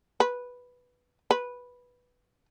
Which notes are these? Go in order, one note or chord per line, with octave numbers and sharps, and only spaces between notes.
B4
B4